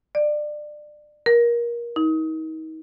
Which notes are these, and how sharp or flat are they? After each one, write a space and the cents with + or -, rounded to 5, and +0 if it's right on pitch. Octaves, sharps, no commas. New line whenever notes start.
D5 +25
A#4 +25
D#4 +35